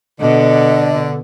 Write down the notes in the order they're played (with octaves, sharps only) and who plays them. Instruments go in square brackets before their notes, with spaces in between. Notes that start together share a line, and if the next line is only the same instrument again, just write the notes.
[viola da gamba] B2 [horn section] D3 [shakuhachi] D#5